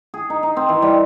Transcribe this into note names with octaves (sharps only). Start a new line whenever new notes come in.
G#4
D#4
D#4
C4
E3
G3